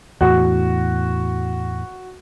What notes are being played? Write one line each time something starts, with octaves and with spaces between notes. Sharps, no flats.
E2 A2 F#4